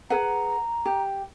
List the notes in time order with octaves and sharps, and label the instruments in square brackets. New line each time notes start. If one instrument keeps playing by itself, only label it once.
[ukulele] G#4 B4 F#5 [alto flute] A#5
[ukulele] G4